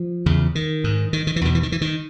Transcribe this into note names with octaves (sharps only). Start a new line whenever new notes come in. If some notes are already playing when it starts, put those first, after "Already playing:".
Already playing: F3
E2 C#3
D#3
G#2
D#3
D#3
E3
E2 B2 D#3
E3
D#3
E3
D#3